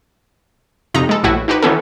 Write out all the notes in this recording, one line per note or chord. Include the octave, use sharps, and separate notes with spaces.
F2 C3 D#4 A#5
G#3 A4
A#1 A2 E4 F#4 B4
D#4 F#4 G4 B4
D#3 E3 B3 C#4 A4